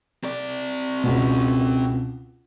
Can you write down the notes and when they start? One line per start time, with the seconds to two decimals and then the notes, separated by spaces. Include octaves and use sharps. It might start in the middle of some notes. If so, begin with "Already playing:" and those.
0.24 C4 D5
1.04 C#2 B2